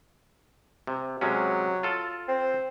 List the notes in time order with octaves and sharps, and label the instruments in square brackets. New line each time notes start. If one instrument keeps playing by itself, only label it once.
[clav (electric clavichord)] C3
[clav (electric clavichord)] C3 G#3 C#4 [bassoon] F#3
[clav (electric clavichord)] F4 A4
[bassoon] C4